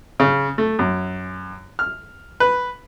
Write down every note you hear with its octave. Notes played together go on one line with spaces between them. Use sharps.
C#3
A3
F#2
F6
B4